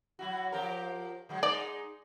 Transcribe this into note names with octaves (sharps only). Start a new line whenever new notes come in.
F#3 E4 F#4
F3 G4 A#4
D3 F#3 G#3
G#3 D#4 D5